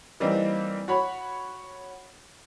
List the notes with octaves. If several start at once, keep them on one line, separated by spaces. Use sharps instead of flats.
E3 G3 A#3 C4 D#4
F#4 C#5 B5